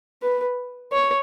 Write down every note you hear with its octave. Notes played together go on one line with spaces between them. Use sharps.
B4
C#5